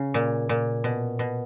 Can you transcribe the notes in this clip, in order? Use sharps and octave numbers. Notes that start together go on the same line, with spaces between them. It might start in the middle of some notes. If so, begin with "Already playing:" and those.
Already playing: C#3
A#2
A#2
B2
B2